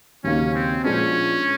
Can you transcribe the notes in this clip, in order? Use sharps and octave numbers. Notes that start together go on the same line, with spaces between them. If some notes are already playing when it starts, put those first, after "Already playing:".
D#2 C#3 F#3 A#3 C#4 D#4
C4
A#2 F3 G#3 B3 C#4 D4